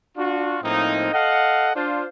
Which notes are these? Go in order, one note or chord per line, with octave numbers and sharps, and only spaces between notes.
D4 F4 F#4
A2 F3 A#3 C4 D#4
A4 D#5 F5 F#5
D4 F4 C5